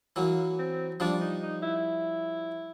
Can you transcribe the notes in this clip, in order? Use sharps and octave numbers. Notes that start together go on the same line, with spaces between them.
E3 F#3 A#3
C4
F3 G3 D4
D#4
D#4
E4